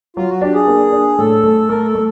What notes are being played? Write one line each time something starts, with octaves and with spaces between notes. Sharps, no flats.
F#3 F4
F#4
D4 G4
G#4
A#3
D4
A2 A4
A3
A3 A#4
A4
A3